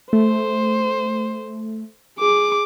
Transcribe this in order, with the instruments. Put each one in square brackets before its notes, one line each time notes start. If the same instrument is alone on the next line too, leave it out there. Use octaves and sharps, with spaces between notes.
[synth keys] A3 [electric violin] C5
[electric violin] G#4 D6